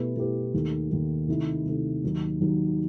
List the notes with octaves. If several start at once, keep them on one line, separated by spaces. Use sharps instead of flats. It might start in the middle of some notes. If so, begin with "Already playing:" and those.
Already playing: B2 A3 E4 G4 B4
B2 A3 E4 G4 B4
D#2 D#3 A3
D#2 D#3 A3
C3 D#3 A3 E4
C3 D#3 A3 E4
D#2 D#3 F#3
D#2 D#3 F#3